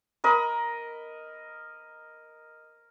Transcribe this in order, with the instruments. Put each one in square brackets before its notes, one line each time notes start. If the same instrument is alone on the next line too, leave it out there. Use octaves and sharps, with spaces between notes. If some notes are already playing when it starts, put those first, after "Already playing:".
[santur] A#4 D#5 B5